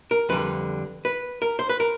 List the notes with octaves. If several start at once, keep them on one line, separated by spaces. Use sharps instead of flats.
A#4
F2 D3 G3 B4
B4
A#4
C5
B4
A#4